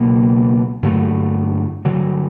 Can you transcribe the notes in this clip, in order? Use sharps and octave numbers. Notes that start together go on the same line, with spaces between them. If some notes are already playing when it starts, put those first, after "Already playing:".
Already playing: C#2 B2 F#3 A#3
G2 D3 F#3 A3
G2 D3 F#3